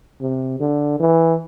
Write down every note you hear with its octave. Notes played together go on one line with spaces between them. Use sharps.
C3
D3
E3